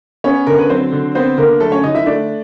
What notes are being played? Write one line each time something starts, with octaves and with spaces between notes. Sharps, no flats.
B3 C#4 C#5
D3 A#4
B4
F#3 C4 C5
D3
B3 C4 C5
D3 A#3 A#4
F#3 A3 A4
C#4 C#5
D3 D#4 D#5
E4 E5
A3 D4 D5